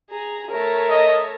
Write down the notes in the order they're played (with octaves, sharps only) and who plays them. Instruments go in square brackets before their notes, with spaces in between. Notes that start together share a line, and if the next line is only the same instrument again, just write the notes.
[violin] G#4 A#5
[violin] A3 C#5 [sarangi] A#4
[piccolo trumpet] D#5